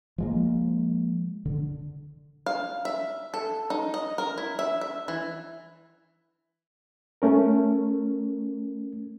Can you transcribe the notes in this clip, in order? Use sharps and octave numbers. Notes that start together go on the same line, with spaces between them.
F3 G#3 A#3
D3
F5
E5
A4
D#4
D#5
A#4
E4
E5
E5
E3
A3 C#4 A#4